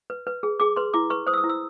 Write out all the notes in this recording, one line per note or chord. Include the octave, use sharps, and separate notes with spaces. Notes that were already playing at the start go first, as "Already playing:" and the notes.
B4
B4
G#4
G#4 D6
B4 C6
E4 D6
B4 C#6
C5 D#6
E6
D#6
E4
E6